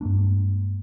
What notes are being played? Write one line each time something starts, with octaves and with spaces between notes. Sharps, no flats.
G2 G#3 A#3 D4